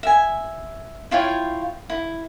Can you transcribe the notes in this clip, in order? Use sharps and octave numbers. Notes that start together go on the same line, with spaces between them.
E5 G#5
E4 F4 C#5 G5
E4